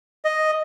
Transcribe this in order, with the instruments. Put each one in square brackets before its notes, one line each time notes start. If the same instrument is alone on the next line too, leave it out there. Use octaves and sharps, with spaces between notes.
[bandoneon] D#5